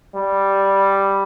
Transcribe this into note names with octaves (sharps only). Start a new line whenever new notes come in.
G3